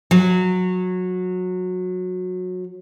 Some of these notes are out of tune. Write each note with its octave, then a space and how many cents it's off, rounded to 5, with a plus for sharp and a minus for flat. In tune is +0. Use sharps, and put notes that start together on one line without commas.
F#3 -20